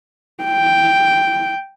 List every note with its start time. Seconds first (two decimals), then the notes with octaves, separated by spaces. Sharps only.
0.44 G5